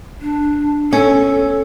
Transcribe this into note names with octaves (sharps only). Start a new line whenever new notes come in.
D4
C#4 A4